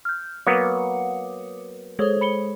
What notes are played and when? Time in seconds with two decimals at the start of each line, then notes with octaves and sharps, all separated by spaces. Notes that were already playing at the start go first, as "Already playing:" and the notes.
0.05 F6 G6
0.47 F#3 A#3 B3 B4 D6 D#6 C#7
1.99 G#3 G#4 A4 C5 C#5
2.21 B5 C#7 G7